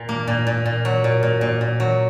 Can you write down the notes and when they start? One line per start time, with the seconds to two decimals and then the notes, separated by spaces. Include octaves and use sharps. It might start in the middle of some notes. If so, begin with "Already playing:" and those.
Already playing: A#2
0.09 A#3
0.27 A#2
0.47 A#2
0.66 A#2
0.85 F#3
1.04 A#2
1.23 A#2
1.41 A#2
1.61 A#2
1.80 F#3